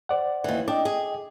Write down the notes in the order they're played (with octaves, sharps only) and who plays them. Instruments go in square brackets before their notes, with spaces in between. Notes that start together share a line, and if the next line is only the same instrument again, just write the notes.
[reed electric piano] C5 D5 F#5
[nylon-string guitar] D#2 E3
[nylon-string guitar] D4 [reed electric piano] D#5 G5 D6
[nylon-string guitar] G#4